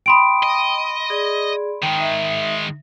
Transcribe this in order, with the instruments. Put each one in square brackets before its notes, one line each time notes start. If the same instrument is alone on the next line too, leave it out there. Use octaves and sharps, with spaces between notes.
[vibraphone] G5 D#6 [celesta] B5 C6 D7
[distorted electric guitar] D#5
[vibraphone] G#4 D5
[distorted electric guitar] D#3 G#3 [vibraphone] G5
[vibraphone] D#4 E5